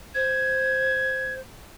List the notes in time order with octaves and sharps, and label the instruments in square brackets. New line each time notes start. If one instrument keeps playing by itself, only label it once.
[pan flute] C5 [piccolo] G#6